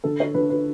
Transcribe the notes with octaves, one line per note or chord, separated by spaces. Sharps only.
D3 A4
C#5
D3 B4
B4